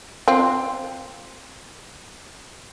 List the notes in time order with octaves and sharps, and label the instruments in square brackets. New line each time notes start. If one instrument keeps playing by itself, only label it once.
[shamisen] C4 F4